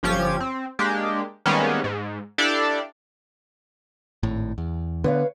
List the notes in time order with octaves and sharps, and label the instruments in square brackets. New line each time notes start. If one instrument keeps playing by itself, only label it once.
[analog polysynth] G1 F3 C#4 G4 G#6
C4
G#3 A#3 D4 G4
D#3 G3 G#3 A#3 B3 C#4
G#2
D4 E4 G4 A4 D5 F5
[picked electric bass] G#1 A2
E2
[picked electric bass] D3 B3 [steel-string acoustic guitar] B4 C#5 F5